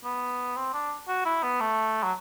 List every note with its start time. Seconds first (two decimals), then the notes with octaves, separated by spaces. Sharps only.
0.05 B3
0.57 C4
0.73 D4
1.08 F#4
1.25 E4
1.43 B3
1.61 A3
2.03 F#3